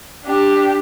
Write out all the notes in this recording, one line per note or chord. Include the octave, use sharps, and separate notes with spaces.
D4 G4